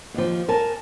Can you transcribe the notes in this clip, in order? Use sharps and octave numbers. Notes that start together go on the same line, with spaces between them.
D#2 F3
A#4 G#5 A5